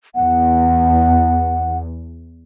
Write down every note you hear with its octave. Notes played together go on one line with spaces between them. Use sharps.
E2 F#5